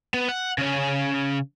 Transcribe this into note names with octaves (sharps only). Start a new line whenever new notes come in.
B3
F#5
C#3 C#4